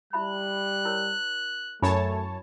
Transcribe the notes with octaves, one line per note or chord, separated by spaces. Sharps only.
G3 E4 E5 B5 F#6
E4 A#4 C#5
F#2 A3 E4 C#5 G#5 A5 B5